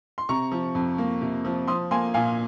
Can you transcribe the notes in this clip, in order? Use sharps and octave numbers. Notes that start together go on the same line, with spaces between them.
C6
C3 A#5 C#6
F3
F2
A#3
C3
F3
F3 C6 D#6
A#3 G#5 C6
A#2 F5 G#5